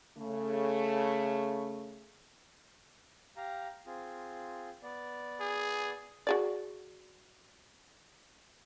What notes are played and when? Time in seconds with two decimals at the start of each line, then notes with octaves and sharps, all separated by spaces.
0.18 C#3 A3
3.36 G4 F5 A#5
3.86 C4 F4 G#4
4.83 B3 D5
5.40 G#4
6.27 F#4 G#4 D5